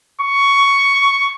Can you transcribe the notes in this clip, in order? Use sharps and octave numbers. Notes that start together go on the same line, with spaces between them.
C#6